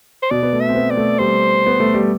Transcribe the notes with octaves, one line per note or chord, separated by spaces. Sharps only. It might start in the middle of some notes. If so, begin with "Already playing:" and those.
C5
B2 D5
B3
A3
E5
C4
B3
D5
A3
G3 C5
B3
A3
G3